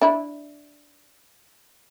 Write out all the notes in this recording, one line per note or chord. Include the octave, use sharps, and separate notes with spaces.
D4 E4